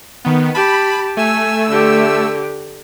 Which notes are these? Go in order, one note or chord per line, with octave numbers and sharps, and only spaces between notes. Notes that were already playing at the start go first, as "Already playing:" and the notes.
D#3 B3
G4 A5 B5
A3 G#5 E6
D3 G4